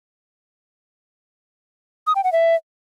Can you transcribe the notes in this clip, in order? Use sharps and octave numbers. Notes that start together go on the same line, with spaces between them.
D#6
G5
F#5
E5